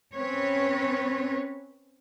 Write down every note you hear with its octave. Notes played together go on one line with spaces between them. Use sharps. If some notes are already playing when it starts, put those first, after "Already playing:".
C4 C#4 B4 C#5